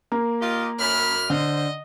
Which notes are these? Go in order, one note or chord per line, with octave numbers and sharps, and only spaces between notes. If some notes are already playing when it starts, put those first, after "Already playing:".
A#3
F4 G4 D#5
F#2 B5 F6
D3 C5 D#5